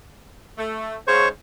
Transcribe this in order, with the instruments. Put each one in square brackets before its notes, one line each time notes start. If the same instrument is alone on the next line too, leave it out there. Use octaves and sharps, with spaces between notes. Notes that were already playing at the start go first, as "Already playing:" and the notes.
[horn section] A3
[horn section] G#2 C#3 [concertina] C5 C#5 C#6